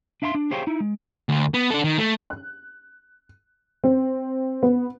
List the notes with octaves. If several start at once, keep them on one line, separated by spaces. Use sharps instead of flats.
D4 E5 F5 A5 C6
D4
G4 G#4 C5 C#5 F5 G5
D#4 E4
G#3
D2
B3
D4 A4
D#3
A3
F#6
C4
B3